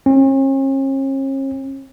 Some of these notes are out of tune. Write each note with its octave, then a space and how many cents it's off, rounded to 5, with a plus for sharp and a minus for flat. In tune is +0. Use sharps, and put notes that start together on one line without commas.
C#4 -45